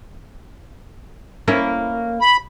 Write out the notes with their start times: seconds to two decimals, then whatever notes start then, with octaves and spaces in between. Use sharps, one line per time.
1.48 A#3 C#4 E4
2.21 B5